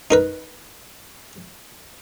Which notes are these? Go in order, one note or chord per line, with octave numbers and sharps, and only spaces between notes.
D#4 A#4 B4